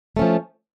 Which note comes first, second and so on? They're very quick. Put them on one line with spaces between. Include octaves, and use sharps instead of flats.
A3 C#4 F3